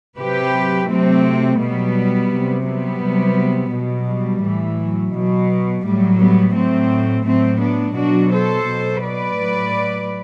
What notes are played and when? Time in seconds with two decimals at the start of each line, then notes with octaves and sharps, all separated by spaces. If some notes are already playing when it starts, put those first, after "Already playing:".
0.18 C3 F#3 G4 B4
0.89 C3 F#3 A3 C4
1.59 B2 F#3 G3 B3
2.31 C3 F#3
2.66 G3 B3
3.01 C3 F#3
3.72 B2 F#3
4.07 G3
4.43 A2 E3
4.78 F#3
5.14 B2 F#3
5.84 A2 F#3 G3
6.20 G3 B3
6.55 A2 F#3 A3 C4
7.26 A2 F#3 A3 C4
7.61 B3 D4
7.96 B2 F#3 D4 F#4
8.32 A4 C5
8.67 B2 F#3
9.03 B4 D5
9.38 A2 F#3